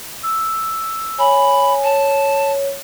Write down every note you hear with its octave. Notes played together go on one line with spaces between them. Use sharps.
E6
C#5 G#5 B5
C#5 A5